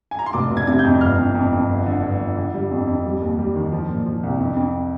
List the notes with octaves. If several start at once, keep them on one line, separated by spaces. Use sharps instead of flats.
G#5
A#5
C6
F1 D6
F1
G#6
C3 G#6
G6
F2
G1 F6
F2
F2
F2
G1
D3
G1
G1
D3
G3
F2
F2
G3
D#2
G3
D#3
F3
A#2
F3
C2
F2
F2